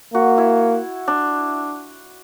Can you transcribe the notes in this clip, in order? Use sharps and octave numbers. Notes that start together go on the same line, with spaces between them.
A#3 F#4
E4
D4